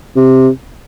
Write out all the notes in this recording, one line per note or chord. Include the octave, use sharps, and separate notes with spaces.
C3